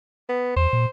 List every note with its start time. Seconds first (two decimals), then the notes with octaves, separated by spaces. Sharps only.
0.29 B3
0.56 E2 C5
0.73 A#2